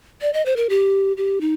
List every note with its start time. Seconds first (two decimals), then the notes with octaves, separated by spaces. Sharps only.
0.21 D5
0.33 D#5
0.46 C5
0.56 A#4
0.69 G4
1.17 G4
1.41 D#4